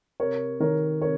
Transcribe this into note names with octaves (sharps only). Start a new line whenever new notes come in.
C3 A#4 C#5
D#3 A#4 C#5
C3 A#4 C#5